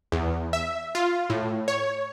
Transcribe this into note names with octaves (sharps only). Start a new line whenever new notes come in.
E2
E5
F4
A2
C#5